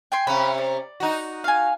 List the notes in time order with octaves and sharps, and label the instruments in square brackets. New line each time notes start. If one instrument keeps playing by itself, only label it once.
[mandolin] G5 G#5 C6
[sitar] C3 C#4 [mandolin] F5 B5
[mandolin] D5
[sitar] D#4 F#4
[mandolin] F5 G#5